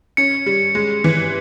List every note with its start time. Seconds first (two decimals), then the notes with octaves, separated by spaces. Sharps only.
0.17 C#4 C#7
0.46 G3
0.75 G#3
1.04 E3